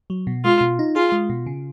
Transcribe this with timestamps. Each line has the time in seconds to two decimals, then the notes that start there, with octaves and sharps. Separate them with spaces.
0.10 F#3
0.27 B2
0.45 G#3 F4
0.61 B2
0.79 D#4
0.96 F4 G#4
1.12 G#3
1.30 B2
1.46 C#3